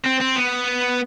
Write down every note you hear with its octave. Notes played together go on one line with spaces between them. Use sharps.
C4
C4
B3